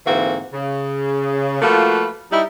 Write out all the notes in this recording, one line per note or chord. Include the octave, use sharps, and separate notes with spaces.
G#2 D3 E3 A#3 C4 F#4
C#3
F3 A3 A#3 F4 F#4 B4
G3 D#4 E4